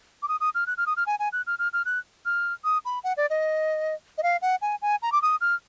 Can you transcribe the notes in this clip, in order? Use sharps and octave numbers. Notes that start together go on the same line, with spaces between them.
D6
D#6
D#6
F6
F#6
F6
D#6
F6
G#5
G#5
F#6
F6
F6
F6
F#6
F6
D#6
B5
F#5
D5
D#5
D#5
F5
F#5
G#5
G#5
A#5
D6
D#6
F6